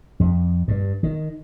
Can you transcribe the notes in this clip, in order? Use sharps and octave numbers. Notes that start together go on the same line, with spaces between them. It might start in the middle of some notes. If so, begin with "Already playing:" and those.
F2
G2
D#3